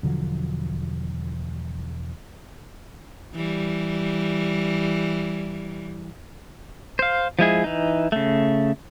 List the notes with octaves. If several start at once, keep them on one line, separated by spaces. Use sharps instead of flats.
E1 D3 F3 F#3
E3 G3
C5 F5
F3 G#3 E4 G#4
E3 D#4
C#3 A3